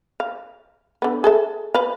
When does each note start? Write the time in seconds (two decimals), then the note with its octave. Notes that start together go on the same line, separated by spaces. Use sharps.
0.20 F5
1.02 D3 B3
1.24 G#4 A4 E5
1.74 B4 F5